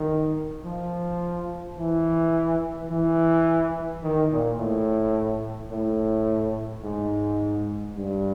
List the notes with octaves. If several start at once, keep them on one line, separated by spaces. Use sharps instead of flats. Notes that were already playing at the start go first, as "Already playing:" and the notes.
Already playing: D#3
F3
E3
E3
D#3
A#2
A2
A2
G#2
G2